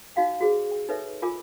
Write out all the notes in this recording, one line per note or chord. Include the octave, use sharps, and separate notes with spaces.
D#4 F#4 F5 G5
F#4 G#4 C5
G5
D#4 A4 B4 C#5 E5
F4 A#4 G#5 D6